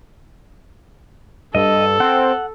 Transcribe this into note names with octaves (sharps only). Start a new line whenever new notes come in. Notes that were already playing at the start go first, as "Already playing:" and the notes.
G2 A4 D#5
C4 F#5